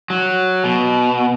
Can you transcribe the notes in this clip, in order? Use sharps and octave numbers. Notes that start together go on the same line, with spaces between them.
F#3
B2